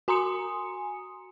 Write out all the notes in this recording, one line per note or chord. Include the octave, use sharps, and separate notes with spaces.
F#4 G#5 A#5 C6 D#6 C#7